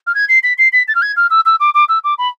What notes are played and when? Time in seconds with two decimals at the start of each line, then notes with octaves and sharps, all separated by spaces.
0.07 F6
0.15 G#6
0.29 C7
0.43 B6
0.58 C7
0.73 B6
0.88 A6
0.95 F6
1.02 G#6
1.17 F6
1.30 E6
1.46 E6
1.60 D6
1.74 D6
1.89 E6
2.04 D6
2.18 B5